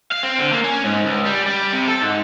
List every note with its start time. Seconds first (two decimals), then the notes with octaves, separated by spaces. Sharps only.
0.12 F5
0.23 C4
0.38 D3
0.53 A#3
0.64 C#4
0.84 G#2
1.05 C#2
1.25 G3
1.47 G3
1.73 C3
1.88 A4
2.02 G#2